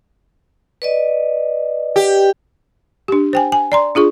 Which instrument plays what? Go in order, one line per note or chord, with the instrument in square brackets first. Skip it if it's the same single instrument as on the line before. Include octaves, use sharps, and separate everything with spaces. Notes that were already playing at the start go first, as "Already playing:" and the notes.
[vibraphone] B4 D5 D#5
[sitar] G4
[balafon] D4 G4
C5 G5 G#5
G#5
D5 A#5 C6
D4 F4 G#4 C#6